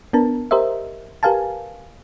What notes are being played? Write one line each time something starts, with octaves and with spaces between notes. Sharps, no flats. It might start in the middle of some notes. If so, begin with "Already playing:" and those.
B3 D4 A#4 A5
G4 A#4 C5 D#5 E5
G4 A#4 B4 F5 G#5 A5